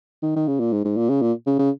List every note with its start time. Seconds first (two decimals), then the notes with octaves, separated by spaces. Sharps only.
0.22 D#3
0.36 D#3
0.48 C#3
0.60 A#2
0.73 G#2
0.84 G#2
0.97 A#2
1.09 C#3
1.22 A#2
1.47 C#3
1.59 C#3